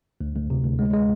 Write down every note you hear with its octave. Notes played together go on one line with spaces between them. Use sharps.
D2
D2
C3
D2
G#3
G#3